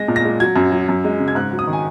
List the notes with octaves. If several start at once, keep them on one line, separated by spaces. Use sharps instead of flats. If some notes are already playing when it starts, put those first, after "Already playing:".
Already playing: G#3 A#6
A#2
A#6
G#3
F#3 G#6
F#2
F#3
F#2
G#3
C#3
G#6
G#2 F#6
F#3
D#6
D#3
G#5